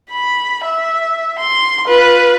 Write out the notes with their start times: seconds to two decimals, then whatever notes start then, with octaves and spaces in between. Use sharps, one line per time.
0.11 B5
0.65 E5
1.39 C6
1.87 F4 B4